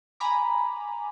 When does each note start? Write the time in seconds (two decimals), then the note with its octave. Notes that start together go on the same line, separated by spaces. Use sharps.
0.20 G#5 A#5 B5 D6